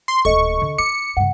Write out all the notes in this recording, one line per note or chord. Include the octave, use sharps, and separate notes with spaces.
C6
D1 A#2 A4 D#5 C#6
D3
D#4 D6 C#7
G2 C#3 F#5